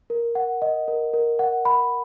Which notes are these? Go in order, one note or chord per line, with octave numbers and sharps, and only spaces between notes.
A#4
F#5
D#5
A#4
A#4
F#5
B5